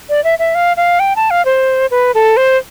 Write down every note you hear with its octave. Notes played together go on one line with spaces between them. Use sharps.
D5
E5
E5
F5
F5
G5
A5
F5
C5
B4
A4
C5